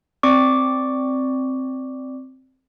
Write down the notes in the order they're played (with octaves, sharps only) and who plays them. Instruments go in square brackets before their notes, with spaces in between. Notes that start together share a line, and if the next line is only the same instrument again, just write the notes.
[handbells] C4 D5 C#6 D6